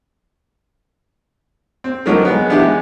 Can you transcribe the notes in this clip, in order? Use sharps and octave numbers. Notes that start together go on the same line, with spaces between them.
C4
D#2 D3 F3 F#3 D#4 A#4
G#3 B3
E3 B3 D4 E4 G4
G#3